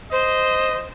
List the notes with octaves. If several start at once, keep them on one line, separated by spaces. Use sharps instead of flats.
C5 D#5